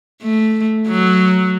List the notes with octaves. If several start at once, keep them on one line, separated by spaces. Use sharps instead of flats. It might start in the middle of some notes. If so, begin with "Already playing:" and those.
A3
F#3